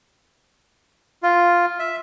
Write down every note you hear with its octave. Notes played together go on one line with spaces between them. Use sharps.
F4
E5